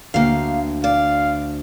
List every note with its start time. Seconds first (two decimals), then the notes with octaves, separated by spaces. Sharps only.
0.14 D2 A#3 F#4 F5 G5
0.84 D5 F5